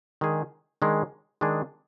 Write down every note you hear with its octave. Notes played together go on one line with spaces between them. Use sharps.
D#3 G#3 D4 G#4
D#3 G#3 D4 G#4
D#3 G#3 D4 G#4